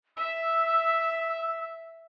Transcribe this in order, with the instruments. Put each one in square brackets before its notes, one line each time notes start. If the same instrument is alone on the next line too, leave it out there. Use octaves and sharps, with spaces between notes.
[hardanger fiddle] E5 [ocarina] E6